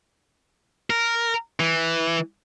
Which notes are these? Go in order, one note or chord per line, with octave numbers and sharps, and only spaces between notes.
A#4
E3